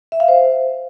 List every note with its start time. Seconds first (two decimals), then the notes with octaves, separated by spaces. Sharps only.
0.12 E5
0.20 F5
0.28 C5